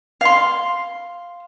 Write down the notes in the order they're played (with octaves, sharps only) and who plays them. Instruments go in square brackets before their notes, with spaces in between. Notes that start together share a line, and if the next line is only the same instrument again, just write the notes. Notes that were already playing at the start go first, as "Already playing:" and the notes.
[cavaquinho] F5 C6